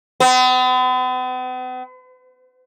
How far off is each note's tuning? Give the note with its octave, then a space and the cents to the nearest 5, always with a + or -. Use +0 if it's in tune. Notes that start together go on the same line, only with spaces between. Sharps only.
B3 +45